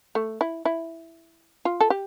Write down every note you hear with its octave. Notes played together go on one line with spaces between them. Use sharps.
A3
E4
E4
F4
A4
G4